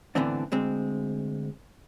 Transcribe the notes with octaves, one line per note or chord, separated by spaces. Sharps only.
A2 D3 E3 B3 C4 D4
D2 G#3 C4